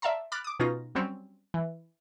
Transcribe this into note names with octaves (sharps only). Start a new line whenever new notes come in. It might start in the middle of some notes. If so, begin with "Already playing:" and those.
D5 E5 F5 A5 A#5 C6
B5 D6 F6 F#6 A6
D6 D#6
B2 C#4 D#4 F4 A#6
F#3 G3 C4 C#4
E3